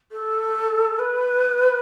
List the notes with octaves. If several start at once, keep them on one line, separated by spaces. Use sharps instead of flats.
A4
B4